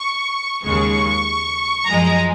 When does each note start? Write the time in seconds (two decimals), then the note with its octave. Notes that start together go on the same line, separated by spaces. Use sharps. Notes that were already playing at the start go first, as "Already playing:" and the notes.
Already playing: C#6
0.63 D#2 C#3 G#3 C#6
1.86 F#2 F3 G#3 A#5